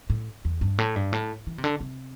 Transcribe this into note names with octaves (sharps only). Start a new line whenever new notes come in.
A2
E2
G2
A2
G2
A2
E3
C3
D3
C3